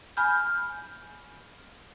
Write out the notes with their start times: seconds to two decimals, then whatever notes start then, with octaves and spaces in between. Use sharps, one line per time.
0.17 G#5 B5 F6 G6